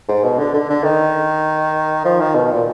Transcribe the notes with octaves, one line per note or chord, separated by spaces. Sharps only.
G#2
B2
D3
D3
D3
D#3
F3
D#3
B2
A#2